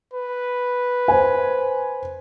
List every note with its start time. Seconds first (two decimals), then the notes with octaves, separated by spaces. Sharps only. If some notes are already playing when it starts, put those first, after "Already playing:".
0.13 B4
1.08 C5 G#5